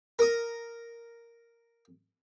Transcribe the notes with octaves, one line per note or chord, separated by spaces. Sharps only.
A#4 D#6